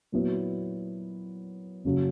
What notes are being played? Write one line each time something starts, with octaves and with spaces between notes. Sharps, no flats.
A#2 F#3 B3 E4
F#1 F#2 C#3 F#3